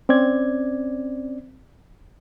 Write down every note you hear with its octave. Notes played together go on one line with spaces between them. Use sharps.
C4 C#4 D5 G#6